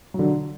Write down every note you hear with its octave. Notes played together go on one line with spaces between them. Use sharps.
D3 F#3